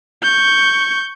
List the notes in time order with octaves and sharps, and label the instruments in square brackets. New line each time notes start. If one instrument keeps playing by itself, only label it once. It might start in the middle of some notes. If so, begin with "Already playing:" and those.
[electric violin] C#6 G6